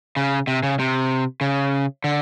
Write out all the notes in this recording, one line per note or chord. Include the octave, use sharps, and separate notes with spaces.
C#3
C3
C#3
C3
C#3
D3